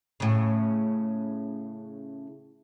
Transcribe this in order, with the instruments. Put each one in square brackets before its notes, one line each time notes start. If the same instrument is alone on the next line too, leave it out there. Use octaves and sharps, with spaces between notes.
[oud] A2 C#3